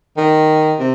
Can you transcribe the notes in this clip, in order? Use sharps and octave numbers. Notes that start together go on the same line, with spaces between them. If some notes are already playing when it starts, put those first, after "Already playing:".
D#3
C3